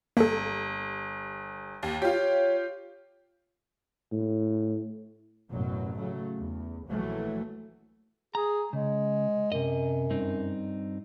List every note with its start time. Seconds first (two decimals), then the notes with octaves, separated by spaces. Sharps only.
0.17 G1 A#3 A4
1.83 D#2
2.02 F4 G4 C#5
4.12 A2
5.51 A1 F#2 B2 F#3
5.96 C#3 F#3 A3
6.36 E2
6.88 A#1 E3 F#3 A3
8.35 G#4 A#5
8.73 C#3 G#3
9.52 F#2 C3 D#5
10.10 G2 C4 D#4